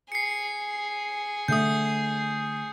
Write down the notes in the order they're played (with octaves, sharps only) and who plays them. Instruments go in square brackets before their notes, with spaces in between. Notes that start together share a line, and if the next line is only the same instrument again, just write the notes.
[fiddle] G#4 [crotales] C7 C#7
[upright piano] D3 A3 [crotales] D#6 G6